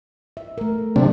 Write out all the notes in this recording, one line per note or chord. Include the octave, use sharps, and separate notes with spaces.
E5
A3 A#4
C3 F#3 A#3 C4 D4